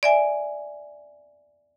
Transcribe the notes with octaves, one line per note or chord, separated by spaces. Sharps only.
D5 E5 G#5